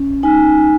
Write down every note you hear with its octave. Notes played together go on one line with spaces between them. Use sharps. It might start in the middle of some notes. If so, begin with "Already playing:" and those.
Already playing: C#4
D#4 G#5